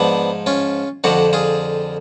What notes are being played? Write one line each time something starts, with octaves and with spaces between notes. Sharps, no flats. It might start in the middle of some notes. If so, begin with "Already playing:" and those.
Already playing: G#2 F3 B3 D4
C#4 F4
F2 D3 F3 D4 F#4
F4 G#4